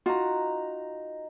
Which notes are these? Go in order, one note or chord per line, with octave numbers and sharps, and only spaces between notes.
D#4 F4 F#4 A#5